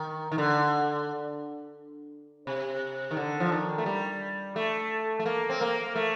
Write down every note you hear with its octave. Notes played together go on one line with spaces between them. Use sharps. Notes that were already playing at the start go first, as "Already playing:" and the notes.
Already playing: D#3
D#3
D3
C3
D#3
D3
F3
D#3
A3
G3
A3
A3
A#3
C4
A#3
A3